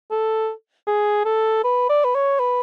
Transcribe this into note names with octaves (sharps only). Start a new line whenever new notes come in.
A4
G#4
A4
B4
D5
B4
C#5
B4